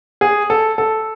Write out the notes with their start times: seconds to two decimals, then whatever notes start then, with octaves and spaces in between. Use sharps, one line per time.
0.21 G#4
0.50 A4
0.78 A4